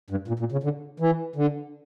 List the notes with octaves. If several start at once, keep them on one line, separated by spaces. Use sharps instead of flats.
G2
A#2
A#2
C#3
D3
E3
D3